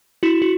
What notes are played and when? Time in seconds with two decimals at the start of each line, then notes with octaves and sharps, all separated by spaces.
0.23 E4 F#4
0.42 F#4